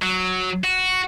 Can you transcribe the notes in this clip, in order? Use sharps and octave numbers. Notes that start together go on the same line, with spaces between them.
F#3
F#4